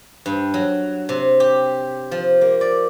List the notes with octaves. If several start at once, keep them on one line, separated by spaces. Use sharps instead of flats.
G2
F#3
C3
G4
F3
A#3
D5